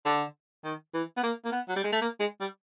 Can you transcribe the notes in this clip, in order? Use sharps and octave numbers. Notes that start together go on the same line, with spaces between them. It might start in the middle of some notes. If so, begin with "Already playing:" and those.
D3
D#3
E3
B3
A#3
A#3
B3
F#3
G3
G#3
A3
A#3
G#3
G3